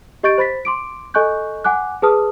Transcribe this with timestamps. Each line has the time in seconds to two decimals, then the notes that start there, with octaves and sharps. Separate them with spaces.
0.23 G4 D#5 C#6 G6 A6 D7
0.38 C5 B5 A6 B6
0.65 C6 D6 D7
1.14 A4 D#5 G#5 C#6 F#6 G6
1.64 F#5 G#5 D6 F#6
2.02 G#4 B4 A5 D#6 F6